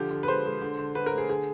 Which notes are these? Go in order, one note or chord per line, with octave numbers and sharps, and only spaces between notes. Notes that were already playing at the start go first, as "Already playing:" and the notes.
Already playing: D3 F3 G4
D3
B4
G#3 C5
G#3
D3
D3
D3 B4
A#4
A3
G#4
D3 G#4